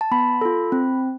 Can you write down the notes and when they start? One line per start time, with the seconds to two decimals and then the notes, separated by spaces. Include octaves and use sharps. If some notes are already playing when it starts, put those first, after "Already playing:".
0.01 A5
0.11 B3 B5
0.41 F4 A4
0.72 C4